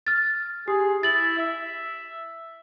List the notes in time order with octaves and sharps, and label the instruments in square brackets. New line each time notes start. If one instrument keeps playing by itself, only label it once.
[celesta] F6 A6
[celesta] G4 [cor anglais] G#4
[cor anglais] E4 [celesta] A6 F#7
[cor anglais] E5